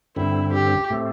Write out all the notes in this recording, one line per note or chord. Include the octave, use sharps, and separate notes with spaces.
G2 D3 C4 E4
G4
A2 A3 C4